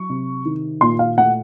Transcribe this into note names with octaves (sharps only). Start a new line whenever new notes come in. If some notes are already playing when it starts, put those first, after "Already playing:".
Already playing: F#3 C#6
C3
D#3
A#2 C6
F5
A3 F#5